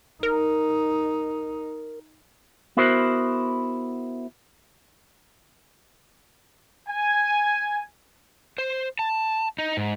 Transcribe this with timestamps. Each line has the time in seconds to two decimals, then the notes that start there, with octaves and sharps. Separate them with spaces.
0.23 D#4 A#4
2.77 B3 E4 F#4 A#4 C5
6.89 G#5
8.58 C5
8.99 A5
9.58 D#4
9.77 G#2